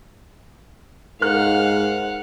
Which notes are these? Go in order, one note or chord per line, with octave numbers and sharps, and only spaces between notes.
G#2 A#4 F5 F#5 F#6